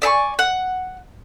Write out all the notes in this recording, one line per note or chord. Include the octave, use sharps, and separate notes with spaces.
D5 E5 G#5 C#6
F#5